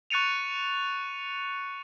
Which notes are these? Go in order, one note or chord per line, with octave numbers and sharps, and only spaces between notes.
C#6 F#6 A6 C#7 D#7 F7